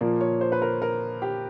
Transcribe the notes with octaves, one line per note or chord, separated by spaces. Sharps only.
A#2 F3 A#3 D5
C#5
C5
B4
A#4
A#4
G4